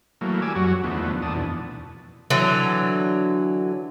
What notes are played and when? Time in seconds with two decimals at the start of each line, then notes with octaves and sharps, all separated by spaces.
0.21 E3 F#3 A3 A#3
0.42 G3 G#5 D6 E6
0.55 F#2 F#3 F#4
0.84 E2 D3 D#3 F3 A3 B3
1.22 D#2 D4 A5 D#6
1.34 F2 B2 E3
2.30 D3 E3 F#3